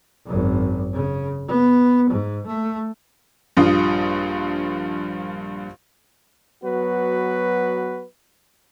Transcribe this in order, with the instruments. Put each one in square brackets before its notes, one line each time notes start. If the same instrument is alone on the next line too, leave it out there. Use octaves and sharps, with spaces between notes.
[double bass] G#1 F#2
C#3
B3
G#2
A3
[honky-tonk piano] A#1 G2 F4 D#6
[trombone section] F#3 B3 F#4 B4